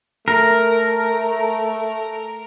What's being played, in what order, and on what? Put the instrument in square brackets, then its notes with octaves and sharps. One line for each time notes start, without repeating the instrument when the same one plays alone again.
[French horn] A3 [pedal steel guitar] A#4